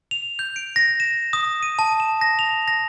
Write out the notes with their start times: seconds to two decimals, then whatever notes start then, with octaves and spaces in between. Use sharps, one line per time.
0.11 F7
0.39 G6
0.56 D7
0.76 A#6
1.00 E7
1.33 D#6
1.63 D#7
1.79 A5
2.00 E7
2.21 A#6
2.39 F7
2.68 A#6